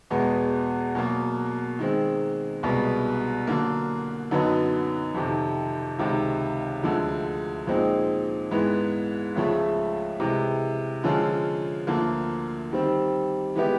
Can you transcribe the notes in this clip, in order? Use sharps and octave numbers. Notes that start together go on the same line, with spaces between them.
E2 B2 G#3 B3
B2 F#3 A#3
D#3 G#3 C4
C2 B2 G#3 B3
D3 F#3 A#3
F#2 D3 F#3 B3 D#4
F2 C3 D#3
C#2 C3 D#3
D2 D3 F3 G#3
A#2 F3 G#3 C4 D#4
G#2 E3 G#3 B3
C#2 C#3 F3 A3
C3 E3 G#3
D3 F3 G#3 C#4 F4
D2 D3 F3 A#3
D#3 G3 C4
E3 G#3 B3 E4 G4